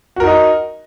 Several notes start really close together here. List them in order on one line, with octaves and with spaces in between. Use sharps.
F#4 A#4 D#4 D#5